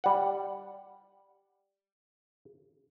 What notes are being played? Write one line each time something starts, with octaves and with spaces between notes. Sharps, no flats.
G3 F#5